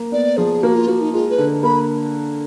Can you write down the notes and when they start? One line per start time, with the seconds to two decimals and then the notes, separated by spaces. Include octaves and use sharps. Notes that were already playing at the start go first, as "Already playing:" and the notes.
Already playing: A#3
0.12 B3 D5
0.37 F3 G#4
0.62 A#3 F#4
0.75 F4
0.87 A#3 F#4
1.01 D#4
1.13 G#3 F4
1.30 B4
1.38 D3
1.63 A#3 B5